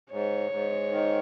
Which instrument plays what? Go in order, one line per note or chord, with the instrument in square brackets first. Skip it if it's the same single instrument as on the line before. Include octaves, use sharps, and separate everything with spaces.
[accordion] G#2 [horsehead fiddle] C#5
[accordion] G#2
D#3